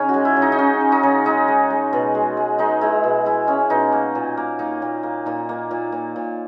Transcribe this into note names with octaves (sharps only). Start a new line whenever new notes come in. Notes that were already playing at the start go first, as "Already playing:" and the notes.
Already playing: C#3 C#4 D#4 G#4
F#4
G#3
E4
C#3
D#4
D#4
C#3 C#4
G#3
D#4
C#3
G#3 D#4
G#3
G#3
B2
G#3
G#3
G#3 D#4
G#3 E4
B2
G#3 E4
G#3 C#4
B2 D#4
A#3
A#2
A#3
A#3 D#4
A#2
A#3
A#2 D#4
A#3
A#2
A#2
A#2